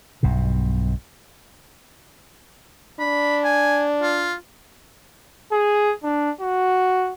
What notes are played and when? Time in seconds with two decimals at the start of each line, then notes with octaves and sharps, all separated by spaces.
0.23 B1 G2 B2
2.99 D4 B5
3.44 G#5
4.02 F4
5.52 G#4
6.03 D4
6.41 F#4